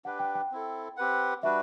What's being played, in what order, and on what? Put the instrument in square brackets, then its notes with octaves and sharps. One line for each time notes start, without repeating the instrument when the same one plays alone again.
[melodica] D4 G4 B4 [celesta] F#5
[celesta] G5
G5
[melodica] C4 E4 A4
C4 G4 B4 F#5
[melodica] G3 D4 F#4 B4 [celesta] E5